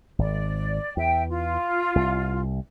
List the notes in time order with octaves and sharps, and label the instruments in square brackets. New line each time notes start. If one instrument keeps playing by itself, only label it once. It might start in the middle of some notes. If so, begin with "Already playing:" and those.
[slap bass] G#1 [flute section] D5
[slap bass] E2 [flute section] E5 G5
[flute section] F4
[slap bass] C2